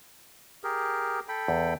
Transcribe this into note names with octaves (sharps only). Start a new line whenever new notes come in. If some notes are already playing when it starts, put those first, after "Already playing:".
G4 G#4 A#4
A4 G5 B5
E2